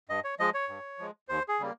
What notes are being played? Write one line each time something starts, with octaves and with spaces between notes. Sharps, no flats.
G2 D#5
C#5
F3 G#3 D#5
C#5
G2
F3 G#3
D#2 C5
G#4
C#3 G3 A#3